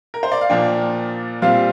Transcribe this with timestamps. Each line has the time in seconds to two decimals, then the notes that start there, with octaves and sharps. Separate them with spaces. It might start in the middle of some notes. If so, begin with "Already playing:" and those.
0.14 A#4
0.23 C5
0.32 D5
0.41 F5
0.49 A#2 F3 A#3 D4 G5
1.42 A#2 G3 C4 F4 F5